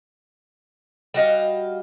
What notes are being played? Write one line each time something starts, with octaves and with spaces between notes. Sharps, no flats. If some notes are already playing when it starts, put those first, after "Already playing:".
G3 F#4 D#5 F5